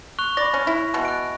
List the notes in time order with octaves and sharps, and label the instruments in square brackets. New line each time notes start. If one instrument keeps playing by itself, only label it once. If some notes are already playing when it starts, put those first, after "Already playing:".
[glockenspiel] C#6 F#6 F7
[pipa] D5 [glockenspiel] B5 A#6
[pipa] C#4
E4
B2 E3
[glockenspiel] F#6 D7